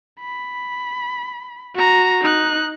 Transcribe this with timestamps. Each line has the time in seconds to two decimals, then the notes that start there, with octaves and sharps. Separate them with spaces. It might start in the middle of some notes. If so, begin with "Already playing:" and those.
0.21 B5
1.75 F#4 A#5
2.22 D#4 F#6